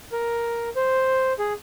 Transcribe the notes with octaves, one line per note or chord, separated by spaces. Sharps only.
A#4
C5
G#4